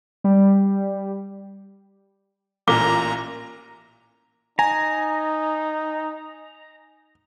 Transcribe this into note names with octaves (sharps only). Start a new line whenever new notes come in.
G3
A1 A#2 A#5 D6
D#4 G#5 A#5